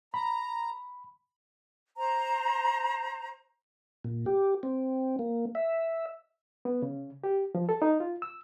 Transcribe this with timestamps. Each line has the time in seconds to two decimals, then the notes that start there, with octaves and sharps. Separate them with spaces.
0.14 A#5 B5
1.98 C5 A#5
4.04 A#2
4.26 G4
4.63 C4
5.19 A#3
5.55 E5
6.65 B3
6.82 C#3
7.24 G4
7.55 F3
7.69 A4
7.82 D#4
8.00 F4
8.22 E6